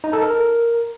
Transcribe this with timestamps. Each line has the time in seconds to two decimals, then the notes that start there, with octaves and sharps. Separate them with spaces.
0.04 D#4
0.13 A4
0.22 A#4